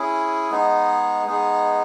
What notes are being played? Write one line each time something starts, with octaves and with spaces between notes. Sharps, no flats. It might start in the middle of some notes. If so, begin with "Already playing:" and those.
Already playing: C#4 E4 G#4
G#3 B3 D#4 G#4
G#3 B3 D#4 G#4